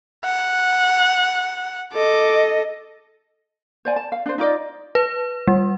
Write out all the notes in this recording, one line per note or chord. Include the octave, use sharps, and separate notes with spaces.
F#5
A4 D#5 D6
C5 D5 G#5
A5
F5
D4 C5
D#4 F4 D5 D#5
B4
G3